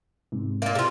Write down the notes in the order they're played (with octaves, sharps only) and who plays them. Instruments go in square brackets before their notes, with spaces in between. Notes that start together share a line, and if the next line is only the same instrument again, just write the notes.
[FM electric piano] G#2 C3
[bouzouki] A#2 A#3
C3 F4